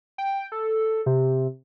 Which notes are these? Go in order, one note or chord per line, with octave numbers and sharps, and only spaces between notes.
G5
A4
C3